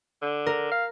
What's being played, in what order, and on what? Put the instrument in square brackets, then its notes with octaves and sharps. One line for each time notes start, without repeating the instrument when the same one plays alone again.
[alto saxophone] D3
[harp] A#4
[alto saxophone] F5